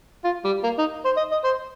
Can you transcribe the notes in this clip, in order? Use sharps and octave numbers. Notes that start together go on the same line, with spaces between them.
F4
G3
A#3
D#4
C5
D#5
D#5
C5